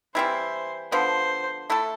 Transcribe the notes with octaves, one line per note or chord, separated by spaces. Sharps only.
E3 G3 C4 E4 C5
D3 F3 B3 C5
A3 E4 A4